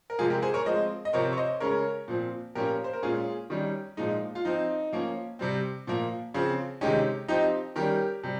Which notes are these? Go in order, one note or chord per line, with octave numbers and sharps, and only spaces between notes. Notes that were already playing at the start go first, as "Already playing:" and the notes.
A#4
C3 F3 G#3 F4 G#4
G4 A#4
G#4 C5
A#4 C#5
F3 G#3 C4 C5 D#5
D#5
C3 F3 C4 A#4 C#5
C#5
C5 D#5
C#3 G#3 C#4 A#4 C#5
A#2 F3 C4
A#2 F3 A#3 C#4 G4 A#4
C5
A#4
A#2 G#3 C#4 F4 G#4
D#3 G3 C#4
A#2 F3 G#3 D#4
F4
F3 C4 D#4
F3 A#3 C#4
C3 G3 C4
A#2 F3 A#3
C#3 F3 C4
C3 D#3 G#3 C#4 D#4 G4
F3 C4 D#4 G4
D#3 G3 C#4 G4 A#4
C3 G3